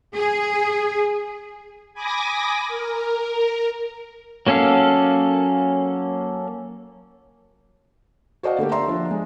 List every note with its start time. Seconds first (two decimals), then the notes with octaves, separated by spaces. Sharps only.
0.15 G#4
1.94 G#5 B5 D6 D#6 A#6
2.67 A#4
4.47 F#3 A#3 C#4 A4 F5
8.43 F#4 C5 D5 D#5 F5 F#5
8.58 D3 A3 A#3 G4
8.71 D5 E5 A#5 C6
8.88 F3 D4 F4
9.11 G#3